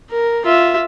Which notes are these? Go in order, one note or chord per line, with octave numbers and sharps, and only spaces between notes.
A#4
F4 E5